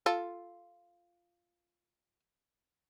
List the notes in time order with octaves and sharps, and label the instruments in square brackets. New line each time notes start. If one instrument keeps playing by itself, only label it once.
[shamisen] F4 A4